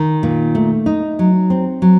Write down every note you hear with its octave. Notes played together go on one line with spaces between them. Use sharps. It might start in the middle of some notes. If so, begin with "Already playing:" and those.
Already playing: D#3
A#2
A3
D#4
F#3
C4
F#3